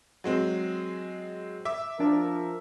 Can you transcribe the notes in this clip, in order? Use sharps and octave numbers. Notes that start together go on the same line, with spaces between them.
F#3 G#3 C4
E5 D6
F3 D4 A#4 D5 A5